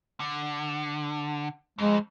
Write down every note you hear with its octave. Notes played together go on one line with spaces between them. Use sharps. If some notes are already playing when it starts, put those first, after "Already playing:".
D3
F2 G#3